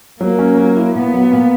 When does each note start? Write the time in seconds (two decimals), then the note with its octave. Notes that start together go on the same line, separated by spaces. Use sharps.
0.20 F#3 A#3
0.39 C#4
0.57 F#3
0.76 E4
0.95 A#2 B3
1.13 F#3
1.32 A#2